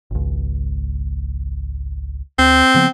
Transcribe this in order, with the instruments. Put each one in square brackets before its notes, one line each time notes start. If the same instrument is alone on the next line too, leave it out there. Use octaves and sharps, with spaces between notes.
[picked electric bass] G#1 C#2
[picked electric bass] D2 [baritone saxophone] C4
[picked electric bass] C#3 F3 B3